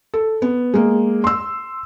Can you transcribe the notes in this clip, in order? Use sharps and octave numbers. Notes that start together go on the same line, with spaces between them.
A4
B3
G#3 A#3
C6 E6